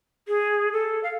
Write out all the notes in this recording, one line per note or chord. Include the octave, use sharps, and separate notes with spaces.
G#4
A4
F5